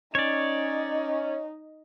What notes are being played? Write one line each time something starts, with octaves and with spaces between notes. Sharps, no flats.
C#4 D#4 C#5 D5